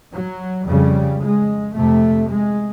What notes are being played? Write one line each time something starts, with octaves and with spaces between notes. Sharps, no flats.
F#3
F2 C#3 G3
G#3
F2 C3 A3
G#3